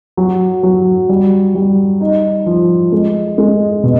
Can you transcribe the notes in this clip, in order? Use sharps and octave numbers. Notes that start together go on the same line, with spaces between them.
F#3
F#3
G3
G3
D#4
F3
G#3
G#3
B2